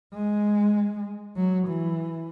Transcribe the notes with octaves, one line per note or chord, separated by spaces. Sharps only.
G#3
F#3
E3